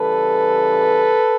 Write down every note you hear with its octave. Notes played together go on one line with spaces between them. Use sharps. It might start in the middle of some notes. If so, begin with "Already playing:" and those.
Already playing: C#3 E3 G3 A4 B4